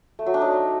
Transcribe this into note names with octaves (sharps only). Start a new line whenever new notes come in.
A3
F#3
D4
D#4